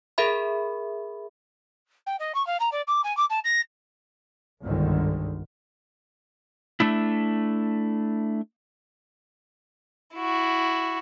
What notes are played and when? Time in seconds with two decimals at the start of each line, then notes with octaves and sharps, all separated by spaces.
0.18 G#4 A#4 E5 B5
2.06 G5
2.19 D#5
2.34 C#6
2.47 F5
2.60 A#5
2.72 D5
2.87 D6
3.04 G#5
3.17 D6
3.30 A5
3.44 A#6
4.64 G1 C2 G#2 D3 D#3
6.80 A3 D4 E4
10.17 E4 F#4